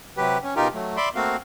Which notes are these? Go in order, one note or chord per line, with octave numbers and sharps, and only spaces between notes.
C3 F#3 G4 B4
C#4
B2 D#4 F4 G4 A#4
F#3 A3
D5 E5 B5 C6 D6
A3 A#3 C4 F#4 F5